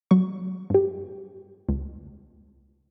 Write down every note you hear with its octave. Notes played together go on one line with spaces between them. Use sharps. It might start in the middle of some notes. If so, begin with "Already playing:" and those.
F#3 C#6
G2 G4
C#2